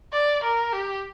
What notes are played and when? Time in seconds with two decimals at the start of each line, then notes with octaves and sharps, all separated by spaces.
0.13 D5
0.43 A#4
0.72 G4